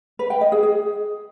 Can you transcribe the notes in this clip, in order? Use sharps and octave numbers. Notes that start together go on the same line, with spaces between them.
B4
G5
D#5
G#4
G#4